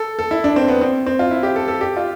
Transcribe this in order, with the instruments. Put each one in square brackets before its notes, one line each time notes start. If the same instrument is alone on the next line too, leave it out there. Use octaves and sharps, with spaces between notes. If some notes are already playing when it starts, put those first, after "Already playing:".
Already playing: [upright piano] A4
A4
E4
D4
C4
B3
C4
C4
F4
E4
G4
A4
A4
G4
F4